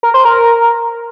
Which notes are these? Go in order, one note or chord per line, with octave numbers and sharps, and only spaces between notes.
A#4
C5
A#4